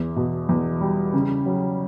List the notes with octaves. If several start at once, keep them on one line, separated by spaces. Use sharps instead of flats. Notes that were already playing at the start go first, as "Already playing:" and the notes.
Already playing: E2
B2
E2
G3
C#3
F#3